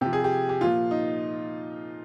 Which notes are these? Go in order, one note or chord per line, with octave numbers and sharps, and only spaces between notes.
C3 F3 G4
G#4
G4
G4
A#2 F3 F4
D#4